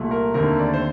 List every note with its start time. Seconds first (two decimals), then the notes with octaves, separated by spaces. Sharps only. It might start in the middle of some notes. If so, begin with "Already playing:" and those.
Already playing: C2 A#2 A3
0.11 A#4
0.34 D#2 D3 A3 C4 A#4
0.59 D5
0.74 C5